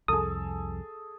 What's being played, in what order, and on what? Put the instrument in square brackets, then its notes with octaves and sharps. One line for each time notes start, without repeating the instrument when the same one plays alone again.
[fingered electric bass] C2 F2 [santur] G#4 A4 [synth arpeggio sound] D#6